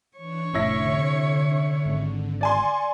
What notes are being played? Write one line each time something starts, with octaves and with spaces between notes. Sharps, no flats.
E3 D4 C#5
F1 A2 D3 C#4 D4 E4 A#6
C3
G#1 G#3
D5 G#5 C6 C#6